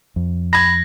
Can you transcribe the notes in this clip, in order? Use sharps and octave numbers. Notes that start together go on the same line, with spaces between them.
F2
B5 G#6 A#6